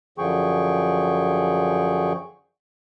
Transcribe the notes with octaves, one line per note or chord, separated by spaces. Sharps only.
F#2 D3 F3 G#4 G5 C#6